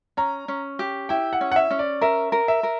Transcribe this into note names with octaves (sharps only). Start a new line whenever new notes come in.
C#4 A#5
C#4
G4
E4 G5
F#5
C#4
F#5
E5
C#4
D5
A#4 E5
A#4
E5
A#4